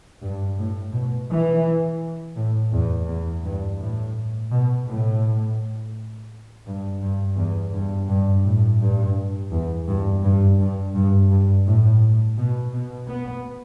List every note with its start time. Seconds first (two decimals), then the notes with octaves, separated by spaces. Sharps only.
0.22 G2
0.58 A2
0.93 B2
1.30 E3
2.37 A2
2.73 E2
3.08 E2
3.44 G2
3.80 A2
4.51 B2
4.87 A2
6.66 G2
7.01 G2
7.37 E2
7.73 G2
8.08 G2
8.45 A2
8.81 G2
9.52 E2
9.88 G2
10.24 G2
10.60 G2
10.95 G2
11.31 G2
11.66 A2
12.38 B2
12.74 B2
13.09 B3